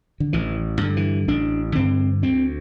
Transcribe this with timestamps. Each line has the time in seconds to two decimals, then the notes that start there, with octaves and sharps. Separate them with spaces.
0.20 D3
0.33 A1 E3
0.81 G2 D3
0.97 E3
1.28 A1 D4
1.75 G2 D3 C4
2.22 D2 C4